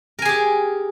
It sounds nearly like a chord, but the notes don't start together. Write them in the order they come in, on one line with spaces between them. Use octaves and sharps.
A#4 G#5 G#4 G4